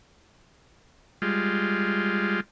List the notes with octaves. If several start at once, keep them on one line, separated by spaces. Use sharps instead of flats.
G3 G#3 F4